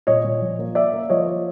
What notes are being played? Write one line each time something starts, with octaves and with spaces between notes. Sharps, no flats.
A#2 C#5 D#5
A#2
F3
A#3
A#3 D5 E5
A#3
F3 C#5 D#5
A#3